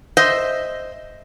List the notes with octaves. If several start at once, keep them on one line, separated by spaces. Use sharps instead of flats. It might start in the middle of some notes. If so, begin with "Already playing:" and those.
C5 D#5 E5